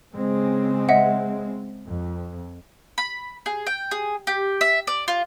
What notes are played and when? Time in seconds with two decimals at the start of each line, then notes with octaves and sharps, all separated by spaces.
0.14 C#3 G#3 C4
0.89 D#5 E5 F#5
1.86 F2
2.98 B5
3.46 G#4
3.67 G5
3.91 G#4
4.27 G4
4.61 E5
4.87 D5
5.08 F4